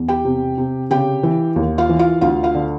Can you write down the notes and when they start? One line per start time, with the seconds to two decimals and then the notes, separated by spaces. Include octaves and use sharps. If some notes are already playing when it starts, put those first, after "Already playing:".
Already playing: E2
0.08 G4 G5
0.25 C3
0.58 C3
0.91 C#3 G4 G5
1.23 E3
1.56 D#2
1.78 F4 F5
1.89 E3
1.99 F4 F5
2.21 D2 F4 F5
2.43 F4 F5
2.55 D3